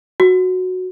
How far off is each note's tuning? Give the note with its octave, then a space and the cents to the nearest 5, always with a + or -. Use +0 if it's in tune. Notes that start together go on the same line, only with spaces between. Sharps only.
F#4 -5